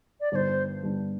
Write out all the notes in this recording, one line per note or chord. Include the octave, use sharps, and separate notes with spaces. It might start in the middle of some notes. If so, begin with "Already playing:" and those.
D5
G1 G2 G3 D4 C5 D5
G1 G2 G3 D4